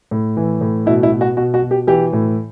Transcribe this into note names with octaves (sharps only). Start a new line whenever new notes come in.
A2
E3
A2
B2 E4
E4
B2
F#4
B2 F#4
F#4
B2
G4
E3 G4
A2